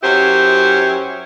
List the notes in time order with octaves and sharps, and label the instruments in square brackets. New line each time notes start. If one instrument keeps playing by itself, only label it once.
[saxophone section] F#2 F#3 C#4 E4 G4 C5